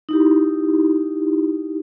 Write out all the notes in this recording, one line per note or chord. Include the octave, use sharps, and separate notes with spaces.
D#4 E4 G4